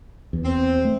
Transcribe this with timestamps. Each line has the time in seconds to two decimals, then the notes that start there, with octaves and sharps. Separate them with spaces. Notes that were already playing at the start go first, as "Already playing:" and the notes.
0.33 E2
0.45 C4
0.85 A3